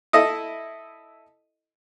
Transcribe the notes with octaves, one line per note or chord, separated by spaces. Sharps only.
E4 A4 D#5 D#6